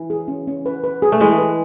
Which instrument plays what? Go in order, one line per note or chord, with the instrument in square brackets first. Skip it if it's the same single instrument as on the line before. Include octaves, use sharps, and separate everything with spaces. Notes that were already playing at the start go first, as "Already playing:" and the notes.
Already playing: [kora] E3
[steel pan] G#4
C#4
C#4
B4
B4
G#4
[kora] A3
[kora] E3 G#3 [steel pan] G#4
[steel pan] B4